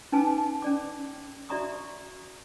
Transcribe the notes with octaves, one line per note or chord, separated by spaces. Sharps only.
C#4 D#4 B4 G#5 A5 D6
C#4 D5 D6
F#4 D5 E5 A#5 C#6 D#6